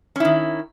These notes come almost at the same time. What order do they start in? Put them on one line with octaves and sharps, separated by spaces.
C#4 E4 D#3